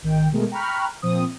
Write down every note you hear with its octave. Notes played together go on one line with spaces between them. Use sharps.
G#1 D#3 G5
B2 G#3 A3 B3 G#4 A#4
G5 A#5 B5 C#6 F6 F#6
A#2 F3 C4 D#6